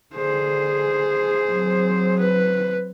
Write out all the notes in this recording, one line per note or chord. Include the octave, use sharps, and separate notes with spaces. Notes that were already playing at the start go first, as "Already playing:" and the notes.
D3 G#4 C5
F#3 C4
B4